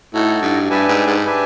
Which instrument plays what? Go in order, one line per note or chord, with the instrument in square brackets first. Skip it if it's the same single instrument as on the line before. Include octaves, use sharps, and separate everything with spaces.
[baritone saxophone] A2 [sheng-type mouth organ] D#4 F#4 A4 C#5
[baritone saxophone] G2
[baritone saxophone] G2 [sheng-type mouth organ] D4 G4 B4 E5 G#5
[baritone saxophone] G#2
G#2
[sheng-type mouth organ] D4 G4 B4 E5 G#5